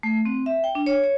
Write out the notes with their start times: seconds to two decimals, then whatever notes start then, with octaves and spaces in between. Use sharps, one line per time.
0.03 A3
0.25 C4
0.46 E5
0.64 G5
0.75 D4
0.86 C#5
1.04 C#5